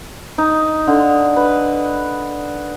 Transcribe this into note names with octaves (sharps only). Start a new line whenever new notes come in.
D#4
D3
B4